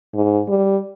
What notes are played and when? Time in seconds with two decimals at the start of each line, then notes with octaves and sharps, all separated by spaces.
0.14 G#2
0.48 G3